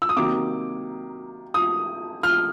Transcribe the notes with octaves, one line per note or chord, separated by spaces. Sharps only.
E6
D#6
C3 D#3 F#3 A#3 D6
D#6
F6